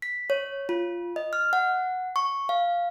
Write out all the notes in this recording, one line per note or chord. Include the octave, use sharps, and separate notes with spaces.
B6
C#5
F4
D#5
F6
F#5
C#6
F5